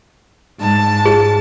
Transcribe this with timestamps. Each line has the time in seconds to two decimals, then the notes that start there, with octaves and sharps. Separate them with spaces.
0.59 G#2 A5
1.06 G#4